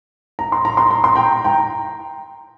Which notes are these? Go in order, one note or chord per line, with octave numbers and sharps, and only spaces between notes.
A#5
C6
A#5
C6
A#5
C6
G5 A#5
G5 A#5